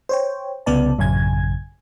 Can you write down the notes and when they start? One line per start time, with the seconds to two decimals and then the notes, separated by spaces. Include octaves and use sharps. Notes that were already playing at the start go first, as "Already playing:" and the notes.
0.09 C5 C#5 G5
0.66 C2 C#3 B3 D5 A5
0.98 A1 F#2 C#3 G#5 G#6